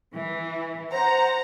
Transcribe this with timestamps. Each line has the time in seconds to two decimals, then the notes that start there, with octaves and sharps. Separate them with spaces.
0.14 E3
0.93 C5 F#5 A#5